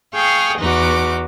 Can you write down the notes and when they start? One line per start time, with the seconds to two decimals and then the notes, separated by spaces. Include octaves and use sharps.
0.15 G#4 F5 G5 C#6 D#6
0.59 E2 D#4 F#4 B4 D6